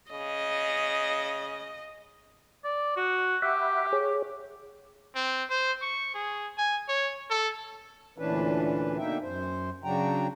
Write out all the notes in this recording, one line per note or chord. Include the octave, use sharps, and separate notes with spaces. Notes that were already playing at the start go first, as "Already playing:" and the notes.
C#3 D#5
D5
F#4
G4 E5 F#5 B5
G#4 C#5
C4
C5
C#6
G#4
G#5
C#5
A4
D2 A#2 E3 C#4 D4 B4
B2 D3 A#3 D#4 E5 G5
F#2 C5
C#3 F#3 D4 F#4 G5 A#5